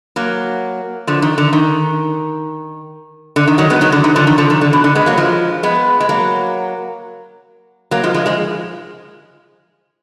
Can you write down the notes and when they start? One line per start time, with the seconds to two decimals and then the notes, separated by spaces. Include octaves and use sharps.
0.16 F#3 A#3
1.07 D3 F3
1.22 D#3
1.38 D3
1.53 D#3
3.36 D3
3.47 D#3
3.58 D#3 F#3
3.70 G#3 B3
3.81 D#3 F#3
3.92 D3
4.04 D#3
4.16 D3 F3
4.27 D#3
4.38 D3 F3
4.50 D#3
4.61 D3
4.73 B2
4.84 D3
4.95 G#3 B3
5.06 F#3 A#3
5.17 F3 G#3
5.63 G#3 B3
6.00 G#3
6.09 F#3 A#3
7.91 F#3 A#3
8.04 F3 G#3
8.14 F3 G#3
8.26 F3 G#3